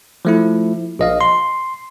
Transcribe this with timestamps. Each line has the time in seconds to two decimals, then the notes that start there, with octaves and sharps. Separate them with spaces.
0.25 F3 A3 E4
0.99 A#1 D#5 F5
1.21 C6